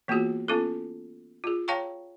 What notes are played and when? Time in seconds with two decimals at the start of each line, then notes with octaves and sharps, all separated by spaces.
0.08 E3 A#3 B3 F4 F#4 G#4
0.48 B3 C#4 E4 F4 A4
1.44 F4 G#4
1.68 C#5 F5 G5 A5 A#5 C#6